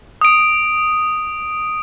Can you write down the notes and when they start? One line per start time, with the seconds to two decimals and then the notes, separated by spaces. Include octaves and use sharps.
0.21 D#6 D7